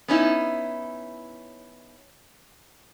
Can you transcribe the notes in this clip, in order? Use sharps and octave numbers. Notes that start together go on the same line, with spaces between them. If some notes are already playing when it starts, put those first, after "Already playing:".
B3 C#4 D#4 E4